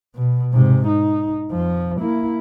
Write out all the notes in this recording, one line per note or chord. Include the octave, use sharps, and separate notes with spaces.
B2
G#2 C3
D#4
F2 F3
A#3 E4